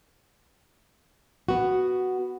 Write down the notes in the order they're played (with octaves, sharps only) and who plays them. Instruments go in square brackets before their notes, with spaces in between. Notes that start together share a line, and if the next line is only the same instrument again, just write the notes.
[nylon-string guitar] B3 F#4